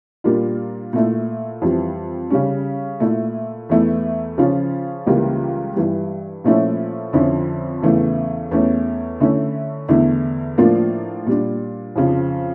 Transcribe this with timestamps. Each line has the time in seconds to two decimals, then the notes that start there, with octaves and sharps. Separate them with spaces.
0.24 A#2 G3 A#3 D4 F4
0.93 A#2 A3 E4
1.62 F2 E3 G3
2.30 C#3 G3 C#4
3.00 A#2 A3 E4
3.69 E2 E3 A3 E4
4.38 C#3 F3 C#4 F4
5.07 C#2 C#3 E3 G3 A#3
5.76 G2 E3 G3
6.44 A#2 F3 A3 C#4 E4
7.13 F2 D3 F3 C#4 E4
7.82 E2 C#3 E3 A3
8.51 E2 E3 A3 C#4
9.20 D3 A3 C#4 E4
9.89 E2 D3 A3 E4
10.58 A2 F3 A#3 D4 F4
11.26 A#2 G3 D4
11.96 F2 C#3 F3